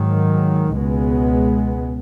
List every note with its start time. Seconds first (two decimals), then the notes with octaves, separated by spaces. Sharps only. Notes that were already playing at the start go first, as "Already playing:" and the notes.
Already playing: G#2 D#3 F#3
0.75 C#2 B2 G#3 B3